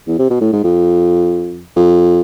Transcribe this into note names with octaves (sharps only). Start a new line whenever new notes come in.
E2
C3
B2
A2
G#2
F2
F2